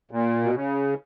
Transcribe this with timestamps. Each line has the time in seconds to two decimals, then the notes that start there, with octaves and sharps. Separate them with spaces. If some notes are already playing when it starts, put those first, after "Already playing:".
0.11 A#2
0.43 B2
0.55 C#3